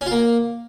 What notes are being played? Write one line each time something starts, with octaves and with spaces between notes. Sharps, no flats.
C#4
F4
A#3